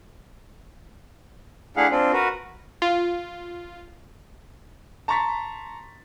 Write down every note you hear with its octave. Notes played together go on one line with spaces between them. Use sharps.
A3 D4 E4 G#4 F5 F#5
C4 D4 F4
F#4 A#4 B4
F4
A5 A#5 C6 C#6 A6 B6